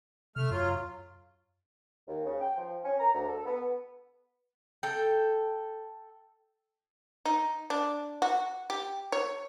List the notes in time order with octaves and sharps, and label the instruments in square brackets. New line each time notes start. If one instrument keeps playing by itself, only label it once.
[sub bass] C3 [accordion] A3 F6
[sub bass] F#2 [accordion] F#3 F4
[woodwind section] D#2
C#3
G5
F3
C#4
A#5
D2
A4
B3
[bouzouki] A4 G5
[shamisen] D#4
D4
F#4
G4
C#5